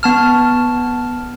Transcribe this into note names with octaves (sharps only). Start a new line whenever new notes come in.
B3 A5 F6